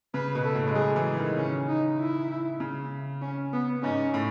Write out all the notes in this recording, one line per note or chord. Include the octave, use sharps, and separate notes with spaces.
C#3 B4
B2
A4
A2
G#3
F#3 G#4
E3
D#3
C#3 C#4
D#4
E4
C#3
C#4
B3
G#2 C#4
A2